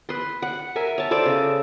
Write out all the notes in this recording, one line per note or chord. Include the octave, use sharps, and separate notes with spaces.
B4 C6
F#5
A#4 E5 G#5
C#5 A5
A4 C5 D5 D6
C#3